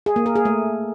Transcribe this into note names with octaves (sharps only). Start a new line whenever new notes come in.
G#4
A#3
A#4
G#4
A3